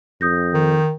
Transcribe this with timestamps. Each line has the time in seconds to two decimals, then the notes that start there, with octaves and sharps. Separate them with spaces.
0.21 F2 D#6 G6 A#6
0.54 D#3